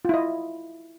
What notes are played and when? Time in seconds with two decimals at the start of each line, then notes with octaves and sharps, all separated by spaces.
0.05 F4
0.09 E4
0.14 D#5